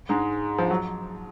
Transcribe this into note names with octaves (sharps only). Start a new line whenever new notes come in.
G#2 G#3
F3
F#3